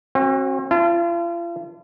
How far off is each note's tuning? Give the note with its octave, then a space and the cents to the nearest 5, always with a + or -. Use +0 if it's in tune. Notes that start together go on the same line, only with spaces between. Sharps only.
C4 +45 F#4 +0
F4 -40 A5 +0